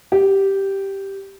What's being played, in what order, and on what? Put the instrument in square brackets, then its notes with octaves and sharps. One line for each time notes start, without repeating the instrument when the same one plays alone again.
[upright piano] G4